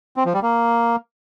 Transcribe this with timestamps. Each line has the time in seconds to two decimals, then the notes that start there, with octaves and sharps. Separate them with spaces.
0.17 C4
0.25 F3
0.34 G3
0.43 A#3